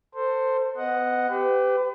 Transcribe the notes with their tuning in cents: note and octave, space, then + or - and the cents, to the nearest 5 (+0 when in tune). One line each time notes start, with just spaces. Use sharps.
A4 +25 C5 +0
B3 +35 D#5 +0 F#5 +0
G4 +0 B4 +40